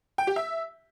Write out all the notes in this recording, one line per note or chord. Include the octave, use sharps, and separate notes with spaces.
G5
G4
E5